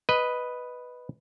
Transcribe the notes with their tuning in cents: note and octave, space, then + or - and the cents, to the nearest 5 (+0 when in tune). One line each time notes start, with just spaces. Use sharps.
B4 +0 D#5 +0